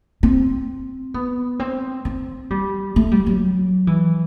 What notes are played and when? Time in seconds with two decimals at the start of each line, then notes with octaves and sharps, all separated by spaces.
0.23 C4
1.14 B3
1.60 C4
2.05 C4
2.50 G3
2.96 A3
3.12 G3
3.26 F#3
3.87 E3